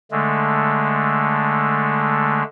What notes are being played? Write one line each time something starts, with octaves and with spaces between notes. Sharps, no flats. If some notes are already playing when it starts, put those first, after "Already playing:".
D3 G#3 A3